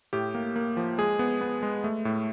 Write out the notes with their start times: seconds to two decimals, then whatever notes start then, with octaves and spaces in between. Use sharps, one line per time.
0.13 A2 G4
0.35 A#3
0.56 A#3
0.77 F3
0.98 G#3 G#4
1.19 B3
1.41 B3
1.63 G#3
1.84 A3
2.05 A2